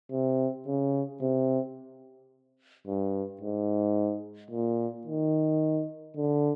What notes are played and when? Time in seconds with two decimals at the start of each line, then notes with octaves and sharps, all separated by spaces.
0.12 C3
0.66 C#3
1.21 C3
2.87 G2
3.41 G#2
4.51 A#2
5.07 D#3
6.17 D3